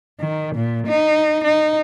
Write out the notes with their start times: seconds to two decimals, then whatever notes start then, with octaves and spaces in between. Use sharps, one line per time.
0.20 D#3
0.56 A#2
0.87 D#4
1.44 D#4